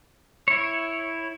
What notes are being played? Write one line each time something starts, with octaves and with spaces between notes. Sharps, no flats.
E4 C#5